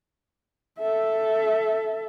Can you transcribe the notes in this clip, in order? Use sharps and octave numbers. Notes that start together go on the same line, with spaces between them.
A4 E5